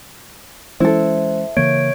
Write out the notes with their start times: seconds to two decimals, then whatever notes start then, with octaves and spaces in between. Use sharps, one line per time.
0.80 E3 G#3 C#4 E4 A4 C5
1.57 C#3 E3 A#3 C#5 G#6 D7